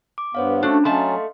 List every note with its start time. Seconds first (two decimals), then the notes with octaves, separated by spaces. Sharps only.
0.18 D6
0.35 G2 B3 C5 C#5 F5
0.63 A3 C#4 D4 F#4 A4
0.85 F#3 A3 C#4 D#5 F5 A5 C6